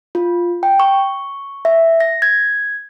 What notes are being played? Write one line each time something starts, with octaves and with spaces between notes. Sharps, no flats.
F4
G5
C#6
E5
A#6
G#6